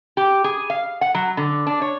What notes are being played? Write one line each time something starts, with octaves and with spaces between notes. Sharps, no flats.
G4
G#4
F5
F#5
F#3
D3
D4
C#5